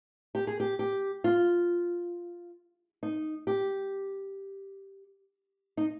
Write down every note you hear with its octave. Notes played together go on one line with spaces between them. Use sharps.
G4
G#4
G4
G4
F4
D#4
G4
D#4